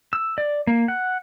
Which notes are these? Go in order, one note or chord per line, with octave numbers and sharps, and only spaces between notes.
E6
D5
A#3
F#5